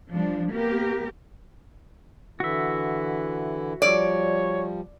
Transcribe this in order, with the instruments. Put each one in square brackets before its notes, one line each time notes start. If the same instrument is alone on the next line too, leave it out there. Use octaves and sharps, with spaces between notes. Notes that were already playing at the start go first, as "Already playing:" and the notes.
[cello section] F3 G3 D4
A#3 B3 G4 A#4
[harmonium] D3 E3 E4 [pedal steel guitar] F#4 E5
[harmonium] F3 G3 [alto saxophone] C#5 [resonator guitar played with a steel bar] D5